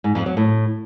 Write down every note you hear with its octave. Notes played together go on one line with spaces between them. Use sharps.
G#2
F2
F#3
A2